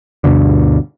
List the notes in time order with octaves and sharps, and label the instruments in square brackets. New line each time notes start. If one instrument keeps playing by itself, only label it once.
[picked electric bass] D2 G2 B2 D3